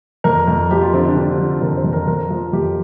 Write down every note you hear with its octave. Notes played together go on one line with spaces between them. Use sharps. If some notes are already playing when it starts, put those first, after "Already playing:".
F2 A#4
F2
F3 G4
F4
D3 C4
D4
D3 G4
F3
F2 A#4
C5
F2
A#4
F2 A#4
F3
F2 G4